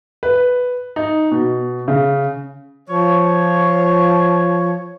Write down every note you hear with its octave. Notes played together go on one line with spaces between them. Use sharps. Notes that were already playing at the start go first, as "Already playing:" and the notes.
B4
D#4
B2
C#3
F3 C#5